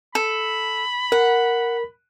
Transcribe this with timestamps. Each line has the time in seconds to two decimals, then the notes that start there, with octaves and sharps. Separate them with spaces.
0.15 A4 B5
1.12 A#4 F#5